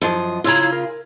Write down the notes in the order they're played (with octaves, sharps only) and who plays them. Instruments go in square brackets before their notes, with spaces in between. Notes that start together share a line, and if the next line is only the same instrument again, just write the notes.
[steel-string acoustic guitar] F#2 F3 D#5
[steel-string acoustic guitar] C#3 F4 [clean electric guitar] E4 C#5 A#5
[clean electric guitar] A#4